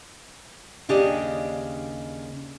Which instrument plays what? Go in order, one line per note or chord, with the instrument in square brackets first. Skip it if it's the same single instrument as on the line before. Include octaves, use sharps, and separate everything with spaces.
[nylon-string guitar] D#2 C#3 D4 G4 D#5